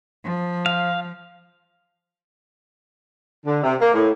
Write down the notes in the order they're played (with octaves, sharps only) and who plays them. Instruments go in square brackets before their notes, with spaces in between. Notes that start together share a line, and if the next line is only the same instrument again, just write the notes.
[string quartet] F3
[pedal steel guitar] F5
[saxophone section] D3
C3
A#3
A2